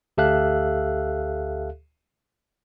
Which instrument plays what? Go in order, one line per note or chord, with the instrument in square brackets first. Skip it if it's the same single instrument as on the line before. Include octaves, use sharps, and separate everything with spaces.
[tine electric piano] D2 G4 A4 E5 F5 F#6